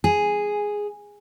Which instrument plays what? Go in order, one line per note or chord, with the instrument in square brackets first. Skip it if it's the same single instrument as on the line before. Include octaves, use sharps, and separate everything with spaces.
[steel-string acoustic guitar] G#4